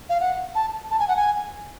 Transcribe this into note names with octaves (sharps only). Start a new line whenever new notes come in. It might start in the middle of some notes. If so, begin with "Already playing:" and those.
F5
F#5
A5
A5
G#5
F#5
G#5